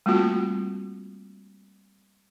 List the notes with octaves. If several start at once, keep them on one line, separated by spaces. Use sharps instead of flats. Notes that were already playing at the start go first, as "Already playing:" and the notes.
G3 A3 A#3 C4 F4 F#4